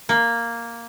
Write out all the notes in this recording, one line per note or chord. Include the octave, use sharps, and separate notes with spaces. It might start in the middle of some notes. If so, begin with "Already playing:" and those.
A#3